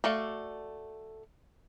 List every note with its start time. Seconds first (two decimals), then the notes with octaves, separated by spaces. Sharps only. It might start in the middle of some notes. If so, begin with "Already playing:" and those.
0.04 A3 F#4 A4 D5 F5